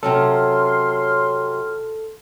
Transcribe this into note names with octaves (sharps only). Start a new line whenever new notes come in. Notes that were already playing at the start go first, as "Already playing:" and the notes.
C3 F#3 C#4 A4 C6 F6